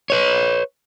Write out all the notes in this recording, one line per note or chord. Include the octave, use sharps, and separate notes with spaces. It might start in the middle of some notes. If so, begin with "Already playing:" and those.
B4 C#5